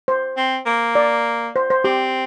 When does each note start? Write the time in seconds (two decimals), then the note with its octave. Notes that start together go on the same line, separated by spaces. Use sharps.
0.08 C5
0.37 C4
0.66 A#3
0.95 D5
1.56 C5
1.70 C5
1.84 C4 G4